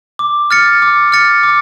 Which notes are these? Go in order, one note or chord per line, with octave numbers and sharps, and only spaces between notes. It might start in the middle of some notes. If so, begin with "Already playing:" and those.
D6
F6 A6 C#7
D6
F6 A6 C#7
D6